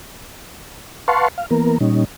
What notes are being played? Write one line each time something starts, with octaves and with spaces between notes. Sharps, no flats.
B4 F5 F#5 A5 C6 C#6
F5
E3 A#3 B3 A#4
A#2 G3 C#4 D#4